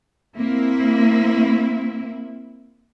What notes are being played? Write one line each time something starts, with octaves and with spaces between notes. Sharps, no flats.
A#3 C4 E4